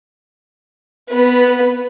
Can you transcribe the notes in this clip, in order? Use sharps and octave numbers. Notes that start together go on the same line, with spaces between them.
B3 B4